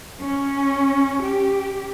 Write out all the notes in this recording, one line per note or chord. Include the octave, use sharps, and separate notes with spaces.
C#4
G4